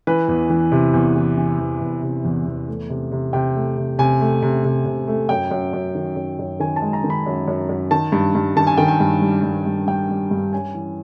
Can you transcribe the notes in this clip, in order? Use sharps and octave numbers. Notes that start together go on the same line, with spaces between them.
E3 B4
E2
E3
C3
E2
E3
E3
E2
E2
C3
E2
E2
A3
C3
C3
C3 G5
A3
C3
C3 G#5
A3
C3
C3
C3
A3
F#2 G5
F#2
F#2
D#3
F#2
F#2
D#3 G#5
A5
G#3
A#5
D#3
B5
F#2
F#2
F#2
D#3 A5
G2
G2
D#3 A5
G#5
D#3 G5
G#5
G2
G3
G2
G2
G3 G5
G3
G2
C#4 G#5
E3